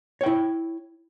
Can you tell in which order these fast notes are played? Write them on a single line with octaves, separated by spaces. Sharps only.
C#5 G5 E4